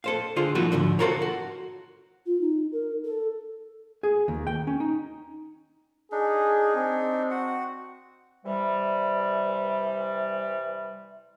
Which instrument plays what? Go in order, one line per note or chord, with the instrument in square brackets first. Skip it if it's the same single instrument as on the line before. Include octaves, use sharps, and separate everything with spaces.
[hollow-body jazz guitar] A4 C5 F5
D3 F4 G#4 C5
B2 D#3 F3 F#3 F4 F#4
B1 G#2 D3 F3
F4 F#4 A4 A#4 C5 C#5
F#4
[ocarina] F4
D#4
A#4
A4
[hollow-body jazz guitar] G#4
D#2
G5
C#4
D#4
[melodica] D4 D#4 [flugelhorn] G#4
[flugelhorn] C4
[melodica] F#4 F#5
[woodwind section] C3 E3 G3